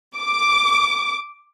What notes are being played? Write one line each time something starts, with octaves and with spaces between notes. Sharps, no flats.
D6